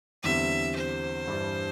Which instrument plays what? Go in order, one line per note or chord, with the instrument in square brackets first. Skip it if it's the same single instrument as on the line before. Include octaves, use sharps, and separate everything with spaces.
[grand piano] E2 D3 G3 C4 [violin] E5
[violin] C5
[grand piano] G2 E3 G3 D4